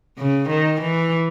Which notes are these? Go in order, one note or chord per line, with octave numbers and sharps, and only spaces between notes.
C#3
D#3
E3